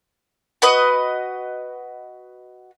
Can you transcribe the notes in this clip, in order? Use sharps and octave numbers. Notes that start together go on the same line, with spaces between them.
F#4 B4 D#5